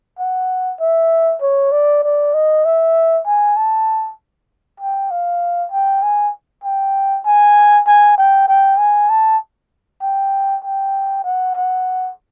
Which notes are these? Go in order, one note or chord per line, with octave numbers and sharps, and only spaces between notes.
F#5
E5
C#5
D5
D5
D#5
E5
G#5
A5
G5
F5
G5
G#5
G5
G#5
G#5
G5
G5
G#5
A5
G5
G5
F#5
F#5